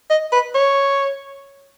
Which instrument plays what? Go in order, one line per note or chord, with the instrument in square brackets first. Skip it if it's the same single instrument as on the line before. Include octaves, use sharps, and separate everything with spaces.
[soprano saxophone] D#5
B4
C#5